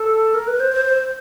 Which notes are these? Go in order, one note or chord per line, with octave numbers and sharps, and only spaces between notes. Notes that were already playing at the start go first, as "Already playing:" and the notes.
Already playing: A4
A#4
B4
C5
C5
C5